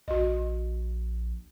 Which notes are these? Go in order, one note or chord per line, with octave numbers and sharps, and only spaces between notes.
A#1 F#4 D#5